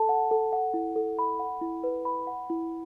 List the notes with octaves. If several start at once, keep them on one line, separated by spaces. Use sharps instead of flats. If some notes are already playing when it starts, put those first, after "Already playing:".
Already playing: A4 A5
F#5
A4
F#5
E4
A4
B5
F#5
E4
B4
B5
F#5
E4